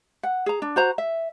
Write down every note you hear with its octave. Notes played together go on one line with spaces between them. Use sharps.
F#5
G#4 A#5
D4
F#4 C5 A#5
E5